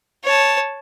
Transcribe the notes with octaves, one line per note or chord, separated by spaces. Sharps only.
C#5 A5